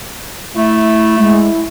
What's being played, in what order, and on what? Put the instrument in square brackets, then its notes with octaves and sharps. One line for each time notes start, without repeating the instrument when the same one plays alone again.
[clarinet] A3 [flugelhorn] E4
[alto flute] G#3 [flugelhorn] E4